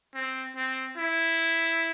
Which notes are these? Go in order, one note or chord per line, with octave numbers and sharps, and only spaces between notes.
C4
C4
E4